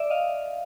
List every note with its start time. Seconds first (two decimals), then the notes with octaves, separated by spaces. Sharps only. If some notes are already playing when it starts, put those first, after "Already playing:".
Already playing: D5 E5
0.10 D#5 F5